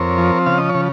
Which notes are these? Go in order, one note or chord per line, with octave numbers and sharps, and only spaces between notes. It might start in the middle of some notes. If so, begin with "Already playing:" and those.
Already playing: F2 C4 A#4 C#5
F3
C#3 F5
D#5
C#5
C#3